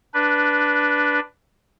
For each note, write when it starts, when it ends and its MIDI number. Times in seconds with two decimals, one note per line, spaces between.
0.14 1.20 62
0.14 1.20 71